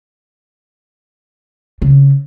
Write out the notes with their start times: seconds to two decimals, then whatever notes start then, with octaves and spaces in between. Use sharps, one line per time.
1.82 C#3